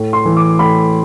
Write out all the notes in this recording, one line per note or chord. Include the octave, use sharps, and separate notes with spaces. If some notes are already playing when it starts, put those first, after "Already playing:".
Already playing: A2
C6
E3
D6
A2 B5